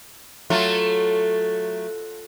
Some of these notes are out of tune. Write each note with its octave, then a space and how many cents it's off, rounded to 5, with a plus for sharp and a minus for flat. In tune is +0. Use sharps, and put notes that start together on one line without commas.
F#3 -5 A3 +0 F4 +5